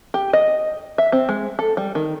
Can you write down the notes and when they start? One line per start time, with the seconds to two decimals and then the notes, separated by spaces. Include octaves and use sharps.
0.14 G4
0.33 D#5
0.98 E5
1.12 C4
1.29 G#3
1.59 A4
1.77 G3
1.95 D#3